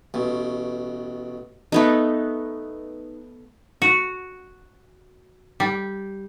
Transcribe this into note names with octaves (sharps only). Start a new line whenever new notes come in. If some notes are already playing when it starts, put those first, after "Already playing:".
A1 B2
A3 B3 D#4
F#4
G3